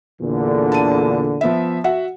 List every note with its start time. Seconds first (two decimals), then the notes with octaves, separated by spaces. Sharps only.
0.21 E2 A#2 D3
0.72 A5 D#7
1.41 F3 B3 E5
1.84 F#4 E5 F#5